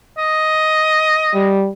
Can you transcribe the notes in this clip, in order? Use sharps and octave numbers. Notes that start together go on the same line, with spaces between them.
D#5
G3